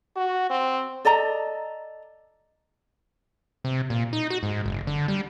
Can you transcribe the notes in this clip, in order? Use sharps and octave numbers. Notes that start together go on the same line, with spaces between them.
F#4
C4
A4 D5 D#5 A#5
C3
A#2
D#4
F#4
G#2
F#1
D3
G3